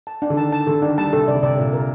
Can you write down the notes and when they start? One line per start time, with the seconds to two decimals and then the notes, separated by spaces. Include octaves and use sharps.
0.07 A5
0.22 D4
0.30 D3
0.37 D#3 A5
0.52 A5
0.67 D3 A4
0.82 D#3 D4
0.98 G3 A5
1.13 C3 A4
1.28 C3 D5
1.35 D3
1.43 C3 D5
1.58 A#2 D5
1.73 A#4